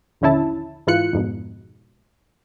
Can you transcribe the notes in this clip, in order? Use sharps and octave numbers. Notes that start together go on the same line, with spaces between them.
A#1 D#2 D3 C#4 E4 A5
G#2 E3 F4 F#6 C#7
F2 G#2 B2